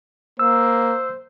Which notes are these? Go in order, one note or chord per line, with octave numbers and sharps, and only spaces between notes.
A#3 C5 E6